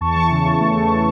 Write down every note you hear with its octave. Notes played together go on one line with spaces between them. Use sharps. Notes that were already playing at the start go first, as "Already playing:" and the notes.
E2 A5 C#6
E3
C#3
E2
A3
E3